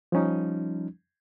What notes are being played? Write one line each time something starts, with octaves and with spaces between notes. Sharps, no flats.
F3 G3 C#4 D#4